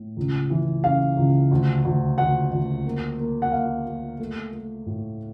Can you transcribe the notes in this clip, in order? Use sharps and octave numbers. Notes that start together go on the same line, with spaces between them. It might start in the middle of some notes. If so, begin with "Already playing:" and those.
Already playing: A2
C#2
E3
C#3 F5
C#2
D2
D2
D2 F#5
D2
A#3
A#3
F#5
A#3 F5
A#3
A3
A3
A2